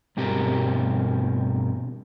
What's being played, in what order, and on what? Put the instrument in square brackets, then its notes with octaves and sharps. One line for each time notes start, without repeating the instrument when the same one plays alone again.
[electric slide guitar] G2 B2 C4 G4 A#4